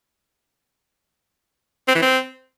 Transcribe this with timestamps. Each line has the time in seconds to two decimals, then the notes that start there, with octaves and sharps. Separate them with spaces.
1.88 C4
1.95 E3
2.02 C4